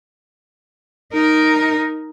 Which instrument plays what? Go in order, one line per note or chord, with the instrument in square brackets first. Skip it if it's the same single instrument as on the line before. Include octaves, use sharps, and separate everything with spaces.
[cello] D#4 A#4